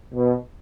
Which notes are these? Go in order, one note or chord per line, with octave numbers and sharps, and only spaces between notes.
B2